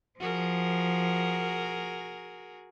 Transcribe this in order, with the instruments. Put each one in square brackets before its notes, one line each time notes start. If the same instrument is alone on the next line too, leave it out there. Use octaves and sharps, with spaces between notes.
[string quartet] F3 [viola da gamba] F#4 G#4 A#4